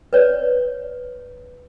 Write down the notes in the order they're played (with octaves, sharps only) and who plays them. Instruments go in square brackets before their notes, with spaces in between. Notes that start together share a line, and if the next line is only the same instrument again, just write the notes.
[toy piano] B4 C#5 D5